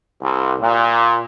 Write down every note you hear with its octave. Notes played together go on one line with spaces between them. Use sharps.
C2
A#2